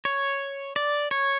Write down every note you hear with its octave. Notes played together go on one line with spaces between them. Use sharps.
C#5
D5
C#5